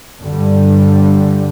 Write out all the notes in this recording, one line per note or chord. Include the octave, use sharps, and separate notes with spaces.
G2 D3 G3